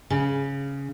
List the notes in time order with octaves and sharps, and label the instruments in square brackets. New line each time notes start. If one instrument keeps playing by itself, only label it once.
[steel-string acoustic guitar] C#3